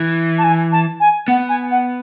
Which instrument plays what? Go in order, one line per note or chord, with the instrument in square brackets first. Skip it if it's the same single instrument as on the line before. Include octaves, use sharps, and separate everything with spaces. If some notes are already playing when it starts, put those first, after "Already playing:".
Already playing: [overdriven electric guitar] E3
[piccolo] A5
G#5
A5
G#5
[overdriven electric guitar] B3 [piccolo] F#5
[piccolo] G#5
F#5